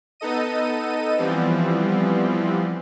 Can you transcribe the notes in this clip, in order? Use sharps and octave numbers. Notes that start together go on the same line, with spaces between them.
B3 D#4 A4 D#5 D#7
E3 F3 G3 B3 C4